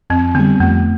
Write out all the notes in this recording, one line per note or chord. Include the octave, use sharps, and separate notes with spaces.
F2 C4
D3 G3 B3
F2 A3